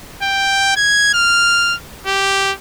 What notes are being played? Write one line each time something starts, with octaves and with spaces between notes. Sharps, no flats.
G5
G#6
F6
G4